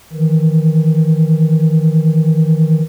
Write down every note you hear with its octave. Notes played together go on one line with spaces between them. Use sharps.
D#3 E3